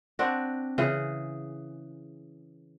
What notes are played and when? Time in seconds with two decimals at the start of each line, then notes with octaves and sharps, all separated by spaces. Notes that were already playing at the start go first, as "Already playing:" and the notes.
0.19 C4 D4 F#4
0.78 C#3 E3 G#4